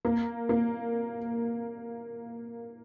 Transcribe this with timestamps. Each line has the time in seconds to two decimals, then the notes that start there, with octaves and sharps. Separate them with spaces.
0.05 A#3
0.49 A#3